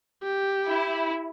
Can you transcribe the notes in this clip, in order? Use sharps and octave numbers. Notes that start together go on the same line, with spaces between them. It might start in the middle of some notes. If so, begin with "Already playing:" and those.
G4
E4